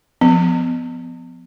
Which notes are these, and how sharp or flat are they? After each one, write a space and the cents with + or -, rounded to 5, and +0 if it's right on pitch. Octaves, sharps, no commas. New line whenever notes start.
F3 +5 B3 +15